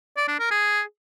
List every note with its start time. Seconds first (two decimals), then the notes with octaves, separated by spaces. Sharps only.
0.17 D5
0.28 D4
0.40 A#4
0.51 G#4